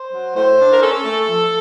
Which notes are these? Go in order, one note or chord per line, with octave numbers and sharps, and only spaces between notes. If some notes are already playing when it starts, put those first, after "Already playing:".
Already playing: C5
F#3
A2 C5
D4
A#4
C#4 A4
A3
F3